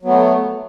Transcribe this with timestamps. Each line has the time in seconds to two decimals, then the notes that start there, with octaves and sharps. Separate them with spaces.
0.02 F#3
0.05 B3
0.08 A3